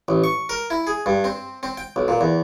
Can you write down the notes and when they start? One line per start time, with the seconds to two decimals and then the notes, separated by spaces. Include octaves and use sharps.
0.08 A1
0.24 C#6
0.49 A#4
0.70 E4
0.87 G#4
1.06 G2
1.24 C4
1.63 C4
1.77 G5
1.96 B1
2.08 A#2
2.21 E2